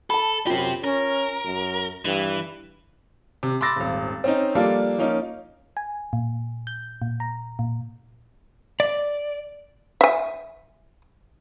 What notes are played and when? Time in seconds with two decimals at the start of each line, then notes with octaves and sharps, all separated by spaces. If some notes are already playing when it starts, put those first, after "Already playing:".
0.10 A4 A5 B5
0.47 F#2 C4 F4 G4
0.84 C#4 A#4
1.45 F#2
2.05 G2 E3
3.43 C3
3.61 B5 C6 D6 E6 A6 A#6
3.76 D#1 G#1
4.24 C4 C#4 D#4
4.55 F3 G3 A#3 D4 F4 A4
4.98 F3 A#3 C#4 D#4
5.77 G#5
6.13 A#2
6.67 G6
7.02 A#2
7.20 A#5
7.59 A#2
8.80 D5
10.01 E5 G#5